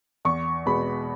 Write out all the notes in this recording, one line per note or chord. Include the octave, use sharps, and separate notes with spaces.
E2 C#6
B2 G#3 B3 B5